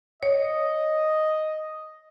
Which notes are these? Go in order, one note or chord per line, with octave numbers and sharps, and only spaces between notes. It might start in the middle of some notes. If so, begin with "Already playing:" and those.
C#5 D#5